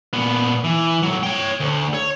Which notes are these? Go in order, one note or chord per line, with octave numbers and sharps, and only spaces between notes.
A#2 B3
E3
A2 F#3
C#5 G5
D2
C#5